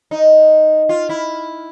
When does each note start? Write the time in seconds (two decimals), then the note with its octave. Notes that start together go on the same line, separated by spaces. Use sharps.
0.11 D#4
0.89 F4
1.09 E4